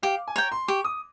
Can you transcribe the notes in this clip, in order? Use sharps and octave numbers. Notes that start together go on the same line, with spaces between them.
G4 F5
G#5
C#5 G5 A#5
C6
G4 C#6
D#6